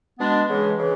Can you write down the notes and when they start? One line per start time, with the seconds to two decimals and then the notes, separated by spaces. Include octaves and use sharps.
0.19 B2 G#3 B3 D4
0.48 C#3 E3 G#3
0.79 C#3 E3